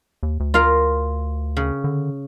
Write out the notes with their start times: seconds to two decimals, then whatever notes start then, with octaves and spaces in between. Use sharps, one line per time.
0.23 D#2
0.40 D2
0.54 F4 A#4 F5
1.57 C#3
1.84 D3